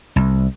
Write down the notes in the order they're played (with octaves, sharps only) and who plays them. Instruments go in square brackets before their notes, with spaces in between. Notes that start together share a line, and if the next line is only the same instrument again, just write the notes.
[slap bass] C2